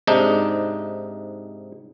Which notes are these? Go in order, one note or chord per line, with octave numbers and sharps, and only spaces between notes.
G#2 C3 D4 D#4